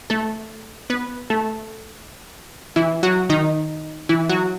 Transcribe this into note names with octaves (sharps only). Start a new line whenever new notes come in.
A3 A4
B3 B4
A3 A4
E3 E4
F#3 F#4
D#3 D#4
E3 E4
F#3 F#4